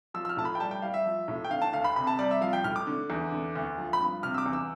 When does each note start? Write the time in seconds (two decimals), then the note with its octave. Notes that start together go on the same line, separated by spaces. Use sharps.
0.14 F3 E6
0.25 E6
0.29 F6
0.37 A2 A5
0.45 B5
0.55 G5
0.60 G3 A5
0.71 G5
0.82 G3 F5
0.94 E5
1.06 F3
1.28 A2
1.45 G5
1.51 D3 F5
1.62 A5
1.73 D2 F5
1.84 B5
1.96 C3 B5
2.07 A5
2.19 G3 D5
2.31 E5
2.41 F3 F5
2.53 G5
2.64 A2 F6
2.76 D6
2.87 D3
3.10 E2
3.32 D3
3.56 D2
3.78 F3
3.93 B5
4.00 G2
4.23 C3 F6
4.34 E6
4.38 D6
4.46 E2
4.53 E6